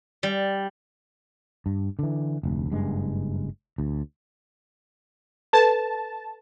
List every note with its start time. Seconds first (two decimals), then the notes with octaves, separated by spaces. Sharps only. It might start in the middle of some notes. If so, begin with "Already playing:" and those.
0.23 G3
1.66 G2
1.99 D3 E3
2.43 F1 D2
2.72 F#1 G2 G#3
3.78 D2
5.53 A4 B4 A5